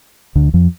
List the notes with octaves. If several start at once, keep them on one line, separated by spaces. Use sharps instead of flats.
D2 D3
F2 F3